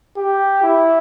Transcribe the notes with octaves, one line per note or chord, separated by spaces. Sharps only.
G4
E4